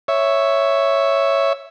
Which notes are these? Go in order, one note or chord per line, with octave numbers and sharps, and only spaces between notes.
C#5 E5